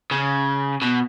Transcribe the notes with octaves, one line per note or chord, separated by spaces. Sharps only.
C#3
B2